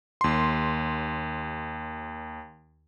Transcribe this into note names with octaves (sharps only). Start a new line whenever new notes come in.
D#2 C6